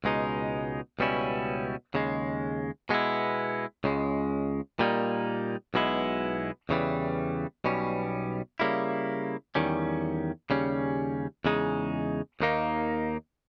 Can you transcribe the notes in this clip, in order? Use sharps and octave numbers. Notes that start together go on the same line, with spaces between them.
C#2 B2 G#3 D#4
C#2 B2 G3 C#4 E4
D#2 C#3 G#3
B2 G#3 B3 E4
C#2 C#3 G#3
A#2 G3 A#3 D#4
B1 B2 G#3 B3 E4
E2 C#3 E3 G3
B1 B2 G3 C#4
C#3 G3 A#3 E4
E2 D#3 G3 C#4
D#2 C#3 G3 C#4
E2 C#3 G#3 D#4
D#2 D#3 A#3 D#4